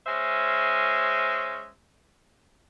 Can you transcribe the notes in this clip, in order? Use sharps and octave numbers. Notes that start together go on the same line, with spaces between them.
G#3 C#4 C5 E5